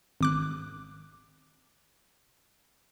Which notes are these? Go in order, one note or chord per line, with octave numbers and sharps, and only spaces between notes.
G#1 D6 F#6